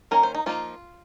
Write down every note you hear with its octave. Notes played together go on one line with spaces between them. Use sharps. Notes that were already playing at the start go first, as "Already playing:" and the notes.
D#3 A#3 C#4 A#4
C5
D#4
F3 A#3 D#4 F4